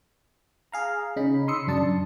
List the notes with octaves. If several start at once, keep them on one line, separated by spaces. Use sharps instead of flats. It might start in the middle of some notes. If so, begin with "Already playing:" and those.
G#4 F5 A#5
C#3 D#4 B5
B5 C6 D#6 E6 C#7
F#2 D4 A5 C#7